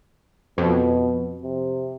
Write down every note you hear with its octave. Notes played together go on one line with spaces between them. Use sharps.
F2 B2
C3